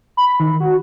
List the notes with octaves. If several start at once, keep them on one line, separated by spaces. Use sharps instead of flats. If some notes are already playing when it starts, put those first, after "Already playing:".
B5
D#3
F#4